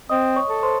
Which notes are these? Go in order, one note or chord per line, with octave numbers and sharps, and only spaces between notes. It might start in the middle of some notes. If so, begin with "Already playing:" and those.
C4 D#5 D#6
C#5 C#6
A4
C5 C6